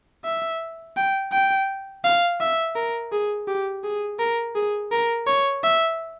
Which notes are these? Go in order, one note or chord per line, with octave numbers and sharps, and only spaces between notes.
E5
G5
G5
F5
E5
A#4
G#4
G4
G#4
A#4
G#4
A#4
C#5
E5